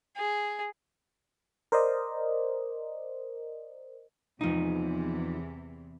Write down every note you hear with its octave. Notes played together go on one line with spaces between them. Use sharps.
G#4
A#4 C5 D5 D#5
E2 C3 E3 F3 D#4